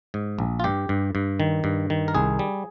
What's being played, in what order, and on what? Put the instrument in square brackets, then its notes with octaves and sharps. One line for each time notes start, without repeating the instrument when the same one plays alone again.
[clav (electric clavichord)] G#2
A#1
F4
G2 G4
G2
G2
D#3
G2
D#3
A#4
C2 G#4
G3